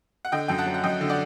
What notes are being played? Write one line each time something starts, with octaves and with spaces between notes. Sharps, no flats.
F#5
D3 D#5 G5
F#2 G5
F#5 A5
F#3
F#5
F#2 D#5 G5
D3
D5 F#5